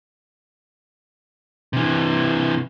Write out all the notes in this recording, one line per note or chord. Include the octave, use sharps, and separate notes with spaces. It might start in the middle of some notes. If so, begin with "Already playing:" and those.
C3 E3